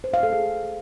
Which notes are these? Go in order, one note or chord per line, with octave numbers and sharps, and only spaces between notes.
C5
F5
A4
G#4